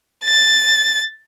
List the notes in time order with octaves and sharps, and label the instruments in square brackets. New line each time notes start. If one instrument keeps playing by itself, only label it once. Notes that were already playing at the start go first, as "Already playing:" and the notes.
[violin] A6